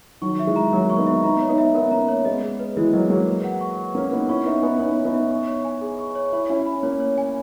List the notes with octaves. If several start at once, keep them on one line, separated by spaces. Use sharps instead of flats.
D#3 F#3 C#6
E5
E3 G#3
A#5
F#3 A#3 A#4
C#6
B3 D#4
E5
B3 D#4 A#5
C#5
B3 D#4
E5
B3 D#4 A#4
A#3 C#4 A#5
C#5
G#3 B3 D#5
G#4
B4
E3 G#3 E4
F#3 A#3 D#5
F#3 A#3 G#4
B4
F#5
C#6
B4
A#3 C#4 B4
B3 D#4 F#5
C#4 E4 C#6
B3 D#4 E5
B3 D#4 G#5
B3 D#4 C#5
C#6
B3 D#4
E5
C#6
C#5
G#5
G#4
C#6
C#5
E4 C#5
C#4 E4 G#5
B5
A#3 C#4 C#5
C#5
G#5